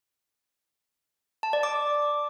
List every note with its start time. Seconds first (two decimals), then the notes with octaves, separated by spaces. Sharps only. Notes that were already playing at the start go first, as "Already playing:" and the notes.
1.43 A5
1.53 D5
1.63 D6